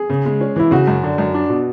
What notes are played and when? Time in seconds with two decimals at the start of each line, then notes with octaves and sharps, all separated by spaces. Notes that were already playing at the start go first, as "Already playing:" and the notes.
Already playing: G#4
0.10 C#3
0.25 G#3
0.41 C#4
0.56 E3 E4
0.71 C#3 F#4
0.87 F#2
1.03 D3
1.18 F#2
1.34 D4
1.50 B2